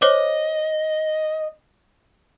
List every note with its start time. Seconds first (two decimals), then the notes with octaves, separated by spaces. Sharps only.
0.02 C5 C#5 D#5 D6